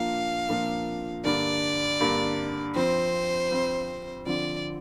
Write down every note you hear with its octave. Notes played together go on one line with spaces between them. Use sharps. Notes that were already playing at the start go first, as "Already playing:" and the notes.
Already playing: A#2 F3 A#3 D4 F4 F5
A#2 F3 A#3 D4 F4
G2 D3 A#3 D4 D5
G2 D3 A#3 D4
F2 F3 C4 C5
F2 F3 C4
D3 F3 C4 D5